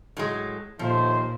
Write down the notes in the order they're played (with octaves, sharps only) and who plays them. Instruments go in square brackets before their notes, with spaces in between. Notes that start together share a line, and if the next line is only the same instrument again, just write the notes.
[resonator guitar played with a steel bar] A2 F#3 G#3
[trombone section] D#2 A3 C5 [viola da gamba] A#2 [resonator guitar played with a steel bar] F3